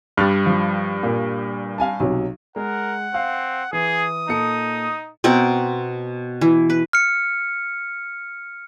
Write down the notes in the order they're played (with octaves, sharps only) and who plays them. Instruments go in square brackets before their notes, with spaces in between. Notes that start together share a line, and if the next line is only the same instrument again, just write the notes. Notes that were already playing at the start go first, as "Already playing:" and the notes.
[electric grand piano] G2 G3 [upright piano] F6 F#6 A6
[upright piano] F3
A#2
F5 G#5 A5
B1 C3 F#3
[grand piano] G#3 [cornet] A#4 [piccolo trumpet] F#5
[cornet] C4 [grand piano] F5
[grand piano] E3 [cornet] G#4 [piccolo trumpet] D#6
[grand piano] A#2 A4 C#7 [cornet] D#4
[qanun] B2 C4 A#4 F#5
E3
B4
[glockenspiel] F6 C#7